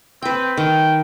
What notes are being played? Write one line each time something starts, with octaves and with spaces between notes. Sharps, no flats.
C4 B4 G5
D#3 G5